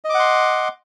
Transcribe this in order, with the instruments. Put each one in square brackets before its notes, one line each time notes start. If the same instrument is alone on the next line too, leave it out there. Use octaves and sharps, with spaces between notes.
[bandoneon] D#5
D6
F#5
C6